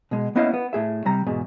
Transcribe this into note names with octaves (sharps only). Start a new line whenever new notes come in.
B2 G#3
A#3 B3 C#4 E4 D#5 F5
B3
A2 G#4 E5
C3 G3 A#5
E2 G#2 B2